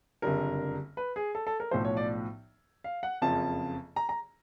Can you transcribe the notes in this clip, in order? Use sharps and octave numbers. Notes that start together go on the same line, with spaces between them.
F#1 F2 D3 G3 A#4
B4
G#4
A4
A4
A#4
B1 A2 F3 C5
C#5
D5
F5
F#5
F#1 F2 C#3 F3 A5
A#5
A#5